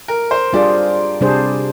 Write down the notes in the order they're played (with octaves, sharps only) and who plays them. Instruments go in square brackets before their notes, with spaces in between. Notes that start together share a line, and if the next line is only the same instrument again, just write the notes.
[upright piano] A#4
C5
[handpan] G3 D4 F4 G#4 C5 [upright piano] D5
[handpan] C3 G3 D4 G#4 C5